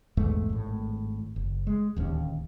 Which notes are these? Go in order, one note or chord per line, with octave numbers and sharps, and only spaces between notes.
A#1 E2 G#2 A3
G#1 A2
F#1
G#3
D1 D#2 C#3 C#4